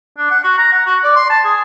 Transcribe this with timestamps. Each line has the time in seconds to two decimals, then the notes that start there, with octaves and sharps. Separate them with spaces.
0.18 D4
0.31 F#5
0.44 F#4
0.58 A#5
0.72 F#5
0.86 F#4
1.03 D5
1.16 C6
1.30 A5
1.44 G#4